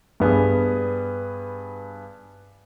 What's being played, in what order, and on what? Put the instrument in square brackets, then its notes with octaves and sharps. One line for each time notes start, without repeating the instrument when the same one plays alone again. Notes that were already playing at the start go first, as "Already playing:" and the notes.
[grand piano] G2 B3 G#4